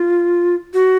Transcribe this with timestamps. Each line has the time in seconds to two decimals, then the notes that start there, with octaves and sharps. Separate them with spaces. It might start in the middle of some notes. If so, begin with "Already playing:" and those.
Already playing: F4
0.74 F#4